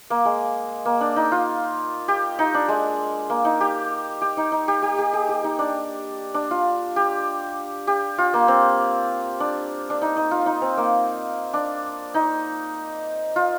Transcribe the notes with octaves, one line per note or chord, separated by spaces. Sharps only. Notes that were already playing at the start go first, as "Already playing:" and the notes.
A#3
G#3
A#3
D4
D#4
F4
G4
D#4
D4
G#3
A#3
D#4
G4
G4
D#4
D#4
G4
G4
G4
G#4
G4
D#4
D4
D4
F4
G4
G4
F4
A#3
C4
D4
D4
D#4
D#4
F4
D#4
C4
A#3
D4
D#4
F4